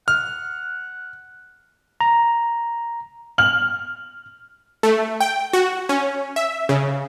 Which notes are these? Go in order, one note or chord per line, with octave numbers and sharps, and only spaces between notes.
F#5 F6
A#5
F6 F#7
A3
G5
F#4
C#4
E5
C#3